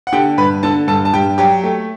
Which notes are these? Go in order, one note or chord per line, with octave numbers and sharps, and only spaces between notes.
F#5
D3 G4 G5
G2 B4 B5
D3 A4 A5
G2 A4 A5
A5
G2 G4 G5
F#3 G4 G5
A3